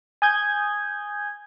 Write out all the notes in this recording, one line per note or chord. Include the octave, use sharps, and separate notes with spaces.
G#5 D#6 G6 G#6